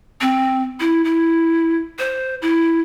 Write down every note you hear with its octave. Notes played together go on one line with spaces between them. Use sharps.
C4
E4
E4
C5
E4